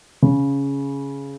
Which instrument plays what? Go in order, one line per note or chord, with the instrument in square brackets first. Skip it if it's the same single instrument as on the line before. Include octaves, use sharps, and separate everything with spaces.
[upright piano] C#3